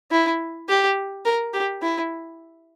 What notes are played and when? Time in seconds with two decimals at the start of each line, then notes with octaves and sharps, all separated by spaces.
0.12 E4
0.69 G4
1.25 A#4
1.54 G4
1.82 E4